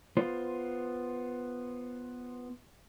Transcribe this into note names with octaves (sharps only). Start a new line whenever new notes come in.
B3 F4 C5